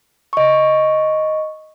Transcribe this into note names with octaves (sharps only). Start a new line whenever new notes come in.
D#5 C#6